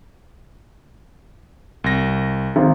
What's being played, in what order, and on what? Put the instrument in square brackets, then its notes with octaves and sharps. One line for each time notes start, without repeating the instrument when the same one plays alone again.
[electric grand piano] C2 A#6
[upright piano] G#1